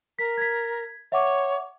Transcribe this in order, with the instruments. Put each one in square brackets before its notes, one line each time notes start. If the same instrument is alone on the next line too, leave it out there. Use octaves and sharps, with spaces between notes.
[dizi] A#4 [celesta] B6
[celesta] G#6 B6
[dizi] C#5 [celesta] E5 F#5 D6